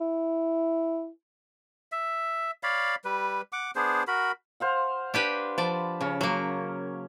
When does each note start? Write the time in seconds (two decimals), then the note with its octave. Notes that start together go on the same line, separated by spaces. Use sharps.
0.01 E4
1.92 E5
2.63 C#5 D5 F5 B5
3.05 G3 B4
3.53 F#5 D6
3.76 B3 D4 G#4 C5
4.08 F#4 A#4 B5
4.60 C5 F5 F#5
5.14 D4 G4 B4
5.58 F3 D5 A5 B5
6.01 C#3 C#4
6.21 F#3 A#3 C#6